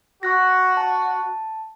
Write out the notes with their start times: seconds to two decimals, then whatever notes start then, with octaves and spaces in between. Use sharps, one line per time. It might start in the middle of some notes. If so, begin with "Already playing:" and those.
0.23 F#4 C#6 F#6 A#6
0.77 A5